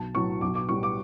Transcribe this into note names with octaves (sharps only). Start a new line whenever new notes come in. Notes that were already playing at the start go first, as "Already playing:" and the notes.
Already playing: B1 A5
A2 F#3 C#6
B1 D6
D6
A2 G3 C#6
D6